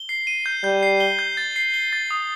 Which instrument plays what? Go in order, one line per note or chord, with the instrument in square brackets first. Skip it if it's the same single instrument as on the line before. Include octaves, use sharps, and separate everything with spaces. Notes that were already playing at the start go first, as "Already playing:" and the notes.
Already playing: [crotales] G7
C7
D#7
G6
[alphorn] G3 [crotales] G6
[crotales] C7
G7
G6
A6
C7
G7
A6
D#6